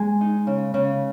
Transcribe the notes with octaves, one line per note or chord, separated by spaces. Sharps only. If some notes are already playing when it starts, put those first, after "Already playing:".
Already playing: G#3 G#5
D#4
C#3
C#3